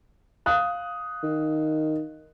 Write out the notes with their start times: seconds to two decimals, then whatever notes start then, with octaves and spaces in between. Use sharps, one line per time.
0.46 F5 D#6 F#6
1.23 D#3